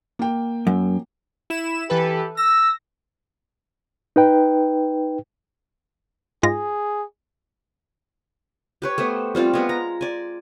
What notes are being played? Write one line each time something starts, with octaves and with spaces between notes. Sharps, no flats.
A#3 G5
F#2
E4 E7
E3 G4 A4 B4
E6 A#6
D#4 B4 G5
G#2 F4 G#4 A#6
G4 B4 C#5
A3 B3 C5
G3 C4 F4 A4
G#3 B3
A#5
D5 G#5